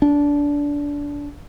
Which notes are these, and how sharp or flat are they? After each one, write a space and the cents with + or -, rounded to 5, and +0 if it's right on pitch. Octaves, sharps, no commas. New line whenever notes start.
D4 -20